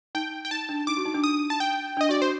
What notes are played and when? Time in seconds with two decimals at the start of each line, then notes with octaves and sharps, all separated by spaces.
0.15 D#4 G5
0.45 G5
0.51 D#4 A5
0.69 D4
0.87 D#4 D6
0.97 F#4
1.05 D#4
1.14 D4
1.24 D#6
1.50 A5
1.60 G5
1.97 D4
2.01 D#5
2.09 F#4 D5
2.21 F#4 C5